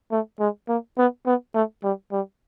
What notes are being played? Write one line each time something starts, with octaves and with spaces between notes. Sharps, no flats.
A3
G#3
A#3
B3
B3
A3
G3
G3